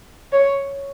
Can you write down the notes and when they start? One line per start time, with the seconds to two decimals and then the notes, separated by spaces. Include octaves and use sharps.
0.32 C#5